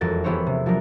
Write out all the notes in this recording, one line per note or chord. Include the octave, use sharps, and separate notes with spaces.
E1 F2 F#4 A#4 A6
E3 B3 E4 G4 C5 C#5
C3
F3 F#3 D4 A#4